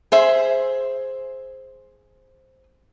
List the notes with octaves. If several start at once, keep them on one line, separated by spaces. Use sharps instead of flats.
G#4 C5 E5